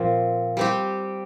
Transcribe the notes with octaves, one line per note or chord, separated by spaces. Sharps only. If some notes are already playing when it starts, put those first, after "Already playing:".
Already playing: A#2 F3 C4
G3 C4 G4